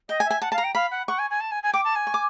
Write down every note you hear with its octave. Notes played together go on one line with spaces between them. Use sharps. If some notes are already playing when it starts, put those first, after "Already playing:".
D#5 G5
G#5
E5
G#5
F#5 A5
F5 A5
A#5
G5
F5 B5
F#5
F#5 C#6
G#5
G#5
A5
G#5
G#5
G5 D6
A5
G#5
C#6
D6